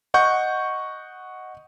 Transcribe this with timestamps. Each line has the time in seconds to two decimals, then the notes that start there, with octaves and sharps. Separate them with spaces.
0.14 D#5 F#5 C#6 G6